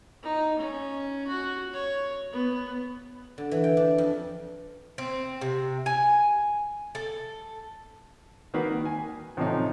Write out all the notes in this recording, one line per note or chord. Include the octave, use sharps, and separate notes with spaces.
D#4
C#4
F#4
C#5
B3
D3
E3
G5
D4
F2
C4
C3
G#5
A4
D#3 A#3 F#4 B4
G#5
A2 C3 E3 F3 C#4 D#4